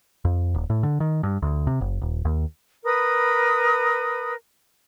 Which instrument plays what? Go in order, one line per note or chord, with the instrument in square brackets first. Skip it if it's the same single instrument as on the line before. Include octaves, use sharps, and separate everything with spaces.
[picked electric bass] F2
D#1
A2
D3
D#3
G2
D2
C3
F#1
D#1
D#2
[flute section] A#4 B4 B5 D#6